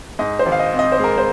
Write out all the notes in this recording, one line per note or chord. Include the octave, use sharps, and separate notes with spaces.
G#2 D#5
C5
G#1
F5
D#5
C4
D#5
C5
G#3 A#4
C5